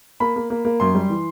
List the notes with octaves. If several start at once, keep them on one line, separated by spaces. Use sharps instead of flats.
A#3 B5
A#3
A#3
A#3
F#2 C6
G3
E3